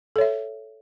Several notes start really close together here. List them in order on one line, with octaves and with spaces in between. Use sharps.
A4 C#5 E5